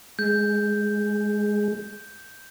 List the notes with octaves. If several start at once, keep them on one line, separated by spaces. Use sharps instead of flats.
G#3 G6